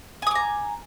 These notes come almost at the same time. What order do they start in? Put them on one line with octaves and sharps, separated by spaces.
G#5 D#6 D6 A#5